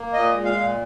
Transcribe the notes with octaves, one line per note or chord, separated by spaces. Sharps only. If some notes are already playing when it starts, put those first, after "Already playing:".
Already playing: A#3
A#2 D#5
G#3
F5
A#2